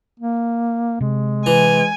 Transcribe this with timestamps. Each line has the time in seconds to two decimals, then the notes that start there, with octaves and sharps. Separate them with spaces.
0.20 A#3
1.00 C3 G#3
1.46 E3 G#5